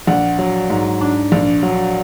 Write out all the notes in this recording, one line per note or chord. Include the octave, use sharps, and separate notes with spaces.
A#1 F#5
F#3
G#2
D4
A#1
F#3